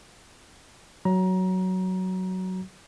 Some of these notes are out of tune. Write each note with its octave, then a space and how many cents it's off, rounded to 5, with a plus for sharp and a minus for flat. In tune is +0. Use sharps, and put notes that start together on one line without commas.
F#3 +5 A#5 +20